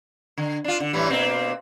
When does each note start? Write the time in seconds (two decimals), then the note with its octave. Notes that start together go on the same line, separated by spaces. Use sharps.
0.37 D3
0.64 D4 F4
0.80 D3
0.93 A2 E3 G3
1.10 B2 A#3 C4